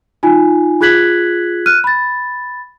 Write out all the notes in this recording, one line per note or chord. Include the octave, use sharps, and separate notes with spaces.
D#4 F4 G#5
F4 G#4 F#6 G#6 B6 F#7
F6 F#6 D#7
B5 A6